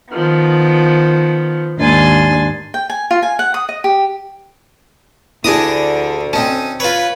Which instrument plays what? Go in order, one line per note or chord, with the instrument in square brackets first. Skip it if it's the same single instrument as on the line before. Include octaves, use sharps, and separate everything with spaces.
[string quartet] D#3 F3 B3
D#2 G#2 D4 G#5 C6 A6
[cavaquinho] G5
G#5
F4
G#5
F#5
D#6
D#5
G4
[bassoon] D2 [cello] D3 [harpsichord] D4 A#5 D#6 [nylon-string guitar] E4 G4 G#4
[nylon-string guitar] C4 A5 [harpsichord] C#4 D#4
[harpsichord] F4 C#5 [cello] B4